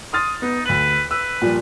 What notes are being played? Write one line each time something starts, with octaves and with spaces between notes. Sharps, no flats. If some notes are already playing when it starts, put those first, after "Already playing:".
C6 D#6 F6 A6
B3 D#4
D2 B4 F#7
B4 E6
A#2 F3 G3